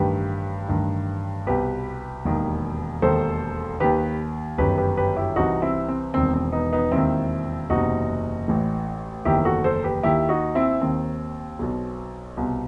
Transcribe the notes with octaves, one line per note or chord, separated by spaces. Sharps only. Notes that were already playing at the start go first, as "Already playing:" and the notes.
Already playing: A1 G2 D#3 G4 B4
A1 G2 D#3
C2 B2 G4 B4
E1 D#2 D#3
E1 D#2 D#3 A4 C5
D#2 D#3 G4 B4
G1 F#2 D#3 G4 B4
G4 B4
G4 B4
E4 G4
C2 C3 E3 D#4 F#4
C4 E4
C4
E1 E2 D#3 C4
C4
B3 D#4
B3 D#4
E1 D#2 D#3 C4 E4
F#1 E2 C3 D#4 F#4
A1 A2 E3
F#1 E2 D#3 E4 G4
F#4 A4
A4 C5
G4 B4
D#2 D#3 E4 G4
D#4 F#4
C4 E4
D#2 D#3 C4
B1 B2
C2 B2